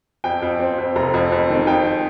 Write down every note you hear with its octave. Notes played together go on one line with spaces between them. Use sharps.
F2 G5
F2
C4
F2
F1 A#5
F2
F2
D#3
F2 G5